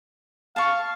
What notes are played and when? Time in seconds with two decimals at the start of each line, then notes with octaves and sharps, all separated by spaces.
0.56 F5 A5 C#6